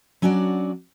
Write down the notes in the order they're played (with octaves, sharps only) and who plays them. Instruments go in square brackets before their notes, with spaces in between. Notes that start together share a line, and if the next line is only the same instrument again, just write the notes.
[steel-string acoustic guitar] F#3 C#4 D4 F#4 D5